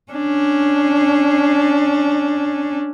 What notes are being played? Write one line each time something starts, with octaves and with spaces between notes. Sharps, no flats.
C#4 D4